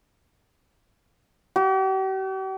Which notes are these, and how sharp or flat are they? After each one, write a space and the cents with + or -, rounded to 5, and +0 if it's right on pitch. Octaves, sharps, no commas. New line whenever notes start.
G4 -45